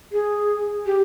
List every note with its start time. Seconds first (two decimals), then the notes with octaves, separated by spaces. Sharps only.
0.12 G#4
0.86 G4